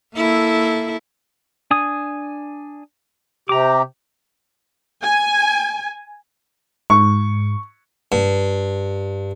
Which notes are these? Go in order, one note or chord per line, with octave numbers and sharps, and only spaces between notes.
A#3 E4 A4
D4 G#5 D#6
C3 G4 A#5 D6
G#5
G#2 C#6
G2